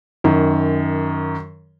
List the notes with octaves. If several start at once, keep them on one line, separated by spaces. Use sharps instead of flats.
F#2 D#3